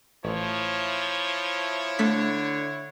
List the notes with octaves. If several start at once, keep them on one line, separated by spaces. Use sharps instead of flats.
A1 F3 E4 C#5
D3 A3 B6